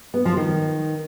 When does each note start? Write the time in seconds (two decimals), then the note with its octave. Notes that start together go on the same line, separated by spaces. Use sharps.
0.14 B3
0.25 F3
0.37 D#3